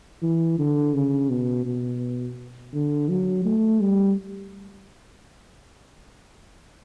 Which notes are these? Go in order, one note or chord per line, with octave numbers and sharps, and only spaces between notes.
E3
D3
C#3
B2
B2
D3
F#3
A3
G3